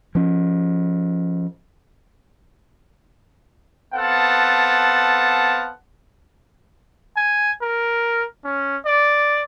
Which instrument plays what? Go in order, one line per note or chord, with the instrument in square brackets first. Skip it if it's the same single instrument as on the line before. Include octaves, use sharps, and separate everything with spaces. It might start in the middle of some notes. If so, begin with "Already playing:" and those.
[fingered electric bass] F3 C#4
[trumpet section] B3 C4 A4 F5 F#5 A5
[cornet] G#5
A#4
C#4
D5